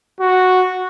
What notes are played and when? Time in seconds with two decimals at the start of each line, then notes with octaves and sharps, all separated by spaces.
0.20 F#4